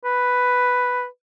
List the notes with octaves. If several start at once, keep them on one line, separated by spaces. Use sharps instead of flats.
B4